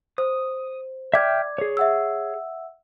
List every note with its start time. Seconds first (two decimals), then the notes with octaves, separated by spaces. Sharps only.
0.18 C5 D#6
1.14 D5 E5 G5 D6 F6 G#6
1.58 G#4 C#5
1.77 E5 F#5 E6